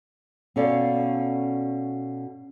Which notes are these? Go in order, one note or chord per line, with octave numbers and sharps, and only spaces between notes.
B2 C#4 A4 D5 F5